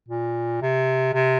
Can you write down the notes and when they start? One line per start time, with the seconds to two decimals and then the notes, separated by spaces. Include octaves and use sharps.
0.09 A#2
0.62 C3
1.14 C3